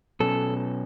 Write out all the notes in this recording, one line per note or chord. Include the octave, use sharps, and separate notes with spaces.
B2 F#3 C#4 A4